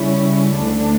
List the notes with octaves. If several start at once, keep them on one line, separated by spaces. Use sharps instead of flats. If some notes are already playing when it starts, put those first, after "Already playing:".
Already playing: C#3 G3 C#4 E4
D2 D3 A3 D4